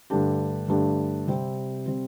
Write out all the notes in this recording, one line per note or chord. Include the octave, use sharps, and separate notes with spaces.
G2 D3 A3 D4 G4
G2 D3 A3 D4 G4
C3 G3 C4
C3 G3 C4